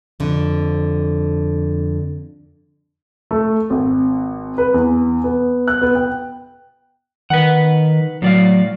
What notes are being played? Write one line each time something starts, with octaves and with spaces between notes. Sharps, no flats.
F2 D3
A3
G#1
B4
E2
B3
F#6
B3
G5
D#3 B4 F#5
A2 F#3 D5 F5